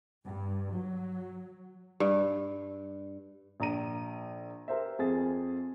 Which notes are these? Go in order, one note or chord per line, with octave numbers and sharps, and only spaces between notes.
G2
F#3
G2
A#1 A#5 D#7
G4 A#4 C5 E5
F2 G#4 C5 G#5 A6